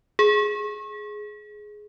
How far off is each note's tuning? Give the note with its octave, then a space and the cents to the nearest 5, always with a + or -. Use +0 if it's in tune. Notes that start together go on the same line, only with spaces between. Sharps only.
G#4 +10